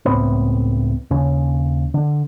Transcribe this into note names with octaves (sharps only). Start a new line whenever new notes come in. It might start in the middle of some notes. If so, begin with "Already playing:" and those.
C#2 A2 B3 C4
D#2 C#3 C#4
D3